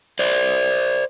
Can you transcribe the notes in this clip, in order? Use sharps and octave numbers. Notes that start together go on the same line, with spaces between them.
C5 D5